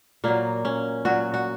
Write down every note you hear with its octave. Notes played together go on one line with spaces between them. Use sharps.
A#2 F#3 A#3
C#4
A#2 F#3 F#4
F#4